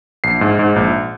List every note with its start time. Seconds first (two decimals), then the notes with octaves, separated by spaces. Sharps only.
0.24 A#1 C7
0.41 G#2
0.59 G#2
0.76 A#1